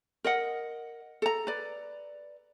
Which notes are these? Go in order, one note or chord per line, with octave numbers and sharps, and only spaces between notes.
A#4 D#5 F#5
A4 A#5
B4 D5